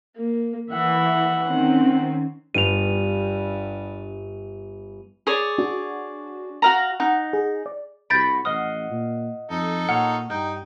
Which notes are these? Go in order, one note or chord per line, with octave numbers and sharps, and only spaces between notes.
A#3
E3 E5 F#5
D#3 C4 C#4 F#5
G1 G2 D#7 F7
G#4 C#5 D5
D4 F#4
F#4 F5 A#5
D#4 F#5
G#4
D5
C2 F#4 B5 G6 A6 D7
A1 D#5 F5 F#5 D#6
A#2
F2 D#4 A4
A#2 C#5 F5 F#5
G2 D#4 G5